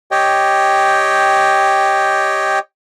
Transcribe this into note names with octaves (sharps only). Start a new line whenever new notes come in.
G4 C#5 D#5 G5